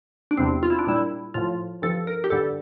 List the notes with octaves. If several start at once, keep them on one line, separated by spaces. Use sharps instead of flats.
D4
E2 C3 G3 C4
F4
E4
D4
A#2 G3 E4
A2 F3 F4
G2 F3 A4
A#4
G4
G2 D3 G3 A4